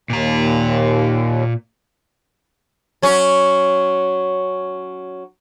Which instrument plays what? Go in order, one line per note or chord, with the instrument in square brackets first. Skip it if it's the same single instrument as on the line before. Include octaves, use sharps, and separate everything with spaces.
[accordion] D#2 [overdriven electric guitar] A#2 A#5
[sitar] F#3 C#4